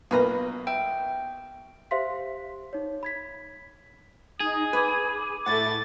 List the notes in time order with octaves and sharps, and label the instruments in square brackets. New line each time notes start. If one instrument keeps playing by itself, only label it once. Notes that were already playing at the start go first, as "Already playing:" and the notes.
[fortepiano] B1 A#3 [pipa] F4 B4 A#5
[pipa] E5 [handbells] G5
[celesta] G4 C5 E5 F5 C6 B6
D#4 C#5
B5 G#6 B6
[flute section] D#4 D#6 [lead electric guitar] G#4
[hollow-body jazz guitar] B4 [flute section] B5 D6 G#6
[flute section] D6
[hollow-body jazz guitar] A2 F#5 [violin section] A3 E4 A6